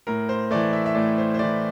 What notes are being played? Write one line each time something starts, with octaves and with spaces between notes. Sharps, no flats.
A2 A#4
C5
E3 A3 D5
E5
E5
A2 D5
C5
C5
E3 A3 D5